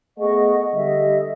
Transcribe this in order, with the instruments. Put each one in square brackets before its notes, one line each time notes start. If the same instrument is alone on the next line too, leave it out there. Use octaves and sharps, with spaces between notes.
[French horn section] A3 B3 G#4 [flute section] D#5 F#5 C#6
[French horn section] D3 G3 [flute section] D#5 E5